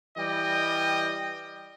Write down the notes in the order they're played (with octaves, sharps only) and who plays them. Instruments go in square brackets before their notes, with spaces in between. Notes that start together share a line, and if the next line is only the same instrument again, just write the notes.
[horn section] E3 G3 D#5 G5